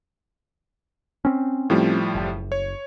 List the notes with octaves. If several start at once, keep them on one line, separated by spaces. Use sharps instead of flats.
C4 C#4
A2 F3 G3
F#1
C#5